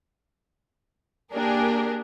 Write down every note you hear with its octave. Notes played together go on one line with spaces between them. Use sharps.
A#3 D4 G4 G#4 A#4